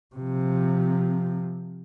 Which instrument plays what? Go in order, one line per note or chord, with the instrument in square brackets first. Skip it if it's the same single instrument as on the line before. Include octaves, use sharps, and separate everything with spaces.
[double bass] C3 F3